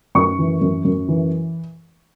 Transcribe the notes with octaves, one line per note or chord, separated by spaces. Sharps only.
F#2 C#6
E3
F#2
F#2
E3